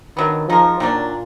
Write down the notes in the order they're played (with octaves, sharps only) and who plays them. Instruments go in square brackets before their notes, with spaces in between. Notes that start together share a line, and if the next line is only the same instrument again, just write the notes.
[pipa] D3 F#3 B3 [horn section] D#3
[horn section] F3 [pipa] G#3 D#4 A#4
[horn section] A#2 [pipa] D#3 F#3 D4